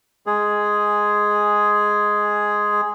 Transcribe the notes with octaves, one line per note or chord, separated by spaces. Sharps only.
G#3 G#4